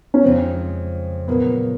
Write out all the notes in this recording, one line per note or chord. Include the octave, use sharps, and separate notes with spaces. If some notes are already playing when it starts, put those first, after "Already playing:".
C#4
F2 C#3 F3 G#3 C4
A#2 F#3 A#3 B3 C#4